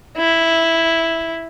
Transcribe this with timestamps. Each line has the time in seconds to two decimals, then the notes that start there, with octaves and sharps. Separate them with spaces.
0.17 E4